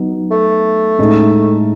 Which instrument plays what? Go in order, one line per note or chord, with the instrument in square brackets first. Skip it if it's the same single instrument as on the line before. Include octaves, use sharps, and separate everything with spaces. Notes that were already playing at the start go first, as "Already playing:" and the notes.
Already playing: [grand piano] F#3 B3 D#4
[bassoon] A3
[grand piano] A2 G#3 D#4